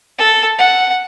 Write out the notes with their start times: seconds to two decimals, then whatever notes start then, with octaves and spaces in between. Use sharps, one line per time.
0.19 A4
0.58 F#5